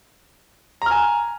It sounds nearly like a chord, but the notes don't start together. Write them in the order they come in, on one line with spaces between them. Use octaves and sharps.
A#5 F6 G#5